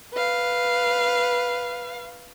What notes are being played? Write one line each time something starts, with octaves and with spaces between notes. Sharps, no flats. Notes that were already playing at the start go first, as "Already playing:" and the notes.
B4 F5